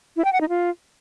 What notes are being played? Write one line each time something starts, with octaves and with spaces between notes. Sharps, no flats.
E4
G5
F#5
D#4
F4